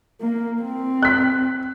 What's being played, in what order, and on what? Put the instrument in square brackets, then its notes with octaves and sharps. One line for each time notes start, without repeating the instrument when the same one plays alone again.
[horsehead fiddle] A#3
C4
[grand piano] F#6 B6